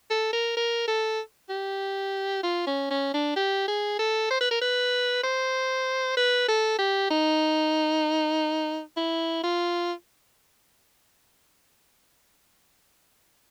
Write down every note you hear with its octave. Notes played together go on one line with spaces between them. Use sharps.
A4
A#4
A#4
A4
G4
F4
C#4
C#4
D4
G4
G#4
A4
C5
B4
A#4
B4
C5
B4
A4
G4
D#4
E4
F4